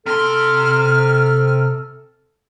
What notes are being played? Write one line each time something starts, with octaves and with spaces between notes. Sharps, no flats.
C3 A4 C6 F6